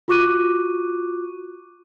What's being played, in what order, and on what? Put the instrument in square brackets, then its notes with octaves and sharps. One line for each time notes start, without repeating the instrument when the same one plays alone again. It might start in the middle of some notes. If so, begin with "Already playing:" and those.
[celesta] F4 F#4 C#6 D6 F#6 D#7